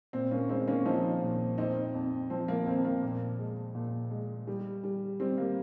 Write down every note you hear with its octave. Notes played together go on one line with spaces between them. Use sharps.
A#2 C4
A#3 C#4
G#3 C4 D#4
A#3 C#4
F3 C4 D#4
A#2
F2 C4 D#4
F2
F3 C4
A#3
F2 C4
A#3
A#2
G#3
A#2
G#3
G3
G3
G3 C4
A#3